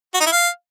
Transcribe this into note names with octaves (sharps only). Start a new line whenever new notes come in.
F#4
D#4
E4
F5